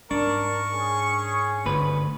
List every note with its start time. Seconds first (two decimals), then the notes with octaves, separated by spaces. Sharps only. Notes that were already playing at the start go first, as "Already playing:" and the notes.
0.11 G#2 D4 A#4 C#6
0.73 C#4 G#4
1.65 G1 D2 B4